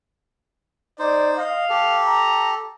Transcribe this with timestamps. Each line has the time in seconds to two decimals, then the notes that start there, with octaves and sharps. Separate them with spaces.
0.99 D#4 C5 D5
1.38 D#5 F5
1.70 G4 A4
2.04 A#5